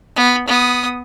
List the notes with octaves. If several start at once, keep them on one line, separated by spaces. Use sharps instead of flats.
B3
B3 D#6